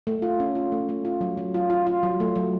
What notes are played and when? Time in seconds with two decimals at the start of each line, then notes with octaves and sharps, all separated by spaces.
0.07 A3
0.22 F4
0.40 C#4
0.55 F4
0.72 A3
0.89 A3
1.05 F4
1.21 F#3
1.37 F#3
1.54 F4
1.70 F4
1.87 F4
2.03 F#3
2.20 A3
2.36 F#3